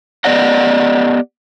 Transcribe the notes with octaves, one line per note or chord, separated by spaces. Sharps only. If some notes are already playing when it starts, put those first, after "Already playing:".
B3 G4 D5 D#5 F#5